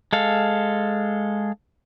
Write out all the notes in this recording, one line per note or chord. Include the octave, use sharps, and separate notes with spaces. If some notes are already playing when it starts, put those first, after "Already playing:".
G#3 A4 F5